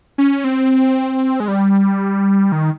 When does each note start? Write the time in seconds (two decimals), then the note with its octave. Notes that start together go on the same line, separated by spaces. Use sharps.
0.18 C#4
0.44 C4
1.40 G#3
1.48 G3
2.52 D#3